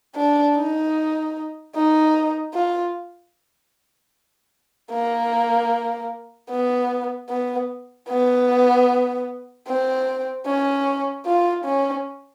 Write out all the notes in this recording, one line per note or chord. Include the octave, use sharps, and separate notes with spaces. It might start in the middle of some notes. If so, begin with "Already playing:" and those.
D4
D#4
D#4
F4
A#3
B3
B3
B3
C4
C#4
F4
C#4